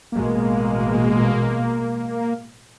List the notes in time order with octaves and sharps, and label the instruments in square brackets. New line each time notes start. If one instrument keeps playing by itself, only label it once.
[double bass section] A1 B2 G#3 [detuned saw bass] A#3